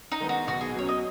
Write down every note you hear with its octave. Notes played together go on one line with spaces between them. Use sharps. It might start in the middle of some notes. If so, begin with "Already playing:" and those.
D#4
D#3 G#3 B3
F#4
B1 F#4
G#4
B2 F#3 C#4 C#5
D#5